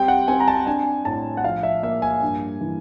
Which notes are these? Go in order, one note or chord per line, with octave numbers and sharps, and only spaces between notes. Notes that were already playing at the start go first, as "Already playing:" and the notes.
Already playing: G3 C4 G5
F#5
C4 G#5
A#5
A5
D4 G#5
A2 A5
F#5
F3 F5
E5
A#3 E5
G#5
G2
E3